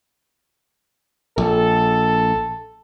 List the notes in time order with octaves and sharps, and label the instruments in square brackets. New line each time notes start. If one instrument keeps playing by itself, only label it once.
[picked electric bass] A#1 [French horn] A4